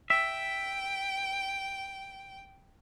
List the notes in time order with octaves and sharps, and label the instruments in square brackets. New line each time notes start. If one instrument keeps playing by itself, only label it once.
[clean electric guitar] E5 [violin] G5